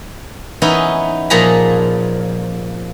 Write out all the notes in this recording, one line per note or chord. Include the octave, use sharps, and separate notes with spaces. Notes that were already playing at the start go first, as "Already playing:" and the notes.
E3 B3 C#4 D#4 E4
A#2 F3 G#4 G#5 A#5 B5